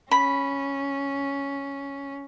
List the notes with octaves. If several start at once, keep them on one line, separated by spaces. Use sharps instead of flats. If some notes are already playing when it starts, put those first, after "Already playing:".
C#4 B5